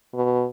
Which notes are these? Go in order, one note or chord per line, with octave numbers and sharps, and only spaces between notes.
B2